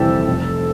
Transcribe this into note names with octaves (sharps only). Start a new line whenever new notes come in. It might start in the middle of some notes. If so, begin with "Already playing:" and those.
Already playing: F2 C3 E3 G3 C4 G4 A4
F1